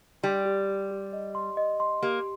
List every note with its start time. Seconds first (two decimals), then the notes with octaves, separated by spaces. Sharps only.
0.23 G3 C6
0.46 G4
0.68 G4
0.91 G4
1.13 D#5
1.35 C6
1.57 D#5
1.80 C6
2.02 A#3 G4